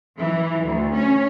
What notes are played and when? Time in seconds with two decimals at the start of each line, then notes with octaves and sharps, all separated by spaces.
0.20 E3
0.64 D2
0.95 C#4